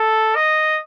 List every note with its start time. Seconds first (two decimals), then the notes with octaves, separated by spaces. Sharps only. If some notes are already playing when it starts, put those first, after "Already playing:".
Already playing: A4
0.36 D#5